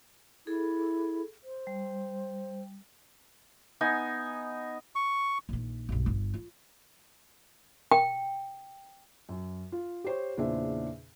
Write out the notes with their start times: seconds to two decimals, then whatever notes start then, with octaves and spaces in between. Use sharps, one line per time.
0.47 E4 G#4 A4
1.44 C5
1.67 G3
3.81 B3 D#4 G#5
4.95 C#6
5.49 A#1 D#3
5.89 B1 G2
6.06 G1
6.34 F4
7.92 G5
9.29 F#2
9.72 F4
10.04 G4 C5 C#5
10.37 E2 A#2 C#3 D4 C5 E5